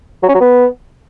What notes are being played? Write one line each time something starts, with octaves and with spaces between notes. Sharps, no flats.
F#3
C#4
F#3
B3